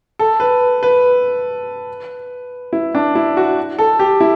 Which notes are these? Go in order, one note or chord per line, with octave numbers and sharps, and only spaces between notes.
A4
B4
B4
E4
D4
E4
F#4
A4
G4
E4